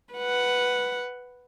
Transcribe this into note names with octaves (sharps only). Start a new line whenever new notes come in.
B4 F#5